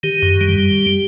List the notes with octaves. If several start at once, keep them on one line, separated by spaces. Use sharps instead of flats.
D#3 G4
F#2
G3